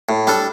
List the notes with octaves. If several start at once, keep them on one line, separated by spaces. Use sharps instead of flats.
A2
G3 D4 A4